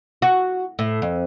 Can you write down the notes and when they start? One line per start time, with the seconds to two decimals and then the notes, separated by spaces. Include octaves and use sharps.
0.22 F#4
0.79 A2
1.02 F2